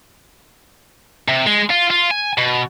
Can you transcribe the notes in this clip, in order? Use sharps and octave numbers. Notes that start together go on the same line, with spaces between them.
C3
G#3
F4
F4
G#5
B2